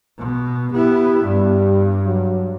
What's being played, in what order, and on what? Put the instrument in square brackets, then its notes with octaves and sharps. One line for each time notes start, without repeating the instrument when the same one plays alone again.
[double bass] B2
[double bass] B3 E4 [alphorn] G4
[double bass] G2 [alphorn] G3
[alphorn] F#3